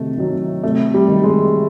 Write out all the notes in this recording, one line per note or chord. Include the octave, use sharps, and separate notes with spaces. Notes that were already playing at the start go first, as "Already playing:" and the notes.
Already playing: C3 D#3 F#3 A3
D#3 F#3
C3 A3
G3
D#3 F#3
G#3